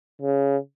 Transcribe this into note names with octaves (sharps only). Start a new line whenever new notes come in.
C#3